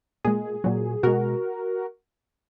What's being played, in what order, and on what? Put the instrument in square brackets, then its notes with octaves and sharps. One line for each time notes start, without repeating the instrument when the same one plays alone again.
[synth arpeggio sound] A#2 G#3 G#4
A#2 F#3
B2 G#3 F#4 A#4